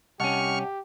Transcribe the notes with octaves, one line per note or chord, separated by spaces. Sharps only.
C2 C#4 G4 D#5 F#5 A5 C#6 F6